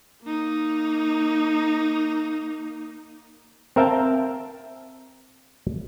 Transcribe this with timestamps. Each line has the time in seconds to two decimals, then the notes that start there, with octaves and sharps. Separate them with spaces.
0.23 A#3 D#4
3.76 C4 A#4 E5 F5 G5 A5